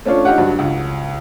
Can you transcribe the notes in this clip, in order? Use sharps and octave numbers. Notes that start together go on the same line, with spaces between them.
A3 C#4 D4 F4 C#5
D#4 F4 G4 F#5
G2 F#3
C#2